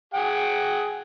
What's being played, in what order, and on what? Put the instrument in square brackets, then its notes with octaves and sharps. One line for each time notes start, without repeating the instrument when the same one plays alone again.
[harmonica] G#4 F#5 G5